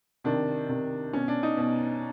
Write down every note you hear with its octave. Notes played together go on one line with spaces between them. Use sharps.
C3 D#3 D4
C3 D#3
B2 C#4
D4
D#4
B2